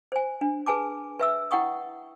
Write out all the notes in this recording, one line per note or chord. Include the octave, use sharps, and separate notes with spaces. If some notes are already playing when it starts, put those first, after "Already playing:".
C5 G#5
D4
G#4 B4 G#5 A5 D6
B4 E5 E6
E4 F#5 G5 C#6 D#6